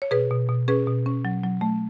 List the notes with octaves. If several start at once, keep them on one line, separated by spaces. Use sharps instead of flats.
C#5
B2 G#4 B4
B2
B2
C#4 G#4 B4
B2
C#4
F#3
F#3
A3